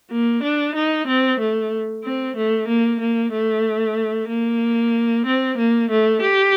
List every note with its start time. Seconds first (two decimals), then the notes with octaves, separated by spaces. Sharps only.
0.11 A#3
0.43 D4
0.75 D#4
1.07 C4
1.40 A3
2.04 C4
2.36 A3
2.68 A#3
3.00 A#3
3.32 A3
4.29 A#3
5.26 C4
5.58 A#3
5.90 A3
6.22 G4